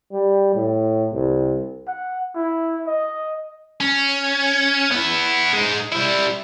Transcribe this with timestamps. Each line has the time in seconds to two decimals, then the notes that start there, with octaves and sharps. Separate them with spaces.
0.13 G3
0.56 A2
1.13 C2
1.87 F#5
2.35 E4
2.87 D#5
3.80 C#4
4.91 B3 E4
5.53 G#3 D#4
5.92 G3 E4